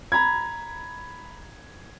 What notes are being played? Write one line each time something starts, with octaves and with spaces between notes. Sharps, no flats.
A#5 B5 G#6